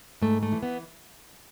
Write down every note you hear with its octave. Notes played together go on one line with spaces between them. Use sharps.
G#2 A3
A3
E3
B3